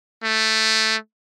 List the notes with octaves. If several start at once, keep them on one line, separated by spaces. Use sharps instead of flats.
A3